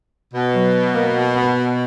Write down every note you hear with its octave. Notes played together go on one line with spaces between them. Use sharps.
B2
F#3
A#3
B3